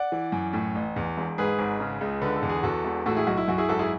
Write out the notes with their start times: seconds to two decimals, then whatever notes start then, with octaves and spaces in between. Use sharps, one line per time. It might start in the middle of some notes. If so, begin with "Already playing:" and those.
Already playing: D5 F#5
0.12 E3
0.32 F#2
0.53 A2
0.75 A1
0.96 E2
1.17 E1
1.38 G#2 G#4 B4
1.59 G#1
1.80 C#3
2.01 C#2
2.21 D3 B4
2.36 A4
2.42 E2
2.49 G#4
2.63 E2 F#4 A4
2.84 E1
3.06 A2 F#4 A4
3.17 E4 G#4
3.27 B1 F#4
3.37 E4
3.48 F#2 F#4
3.58 E4 G#4
3.69 G#1 F#4 A4
3.79 E4 G#4